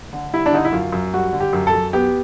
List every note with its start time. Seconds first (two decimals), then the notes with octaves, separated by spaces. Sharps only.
0.13 D3
0.33 G3 E4
0.46 D4
0.53 D3 D#4
0.65 E4
0.72 F#2 F4
0.93 F#2
1.13 G3 F#4
1.33 D3
1.40 G4
1.53 F#2
1.67 A4
1.73 F#2
1.93 B3 G4